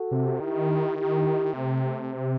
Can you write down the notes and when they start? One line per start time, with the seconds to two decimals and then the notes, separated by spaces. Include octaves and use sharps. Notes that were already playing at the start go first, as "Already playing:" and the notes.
Already playing: F#4 A4
0.11 C3
0.40 D#3 E4 G4
0.97 E4 G4
1.53 C3 A3 C4
1.81 A3 C4